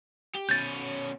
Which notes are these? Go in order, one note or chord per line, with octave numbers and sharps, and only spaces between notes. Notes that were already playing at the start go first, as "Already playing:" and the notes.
G4
B2 C#4 G6 A6